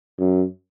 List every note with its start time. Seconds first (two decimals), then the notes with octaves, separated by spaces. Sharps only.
0.19 F#2